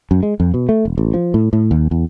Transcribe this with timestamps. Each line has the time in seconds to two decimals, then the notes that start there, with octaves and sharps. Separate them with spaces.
0.11 F#2
0.23 G#3
0.40 F2
0.54 B2
0.69 A3
0.85 E1
0.98 A1
1.14 F3
1.34 A2
1.53 A2
1.71 D#2
1.91 E2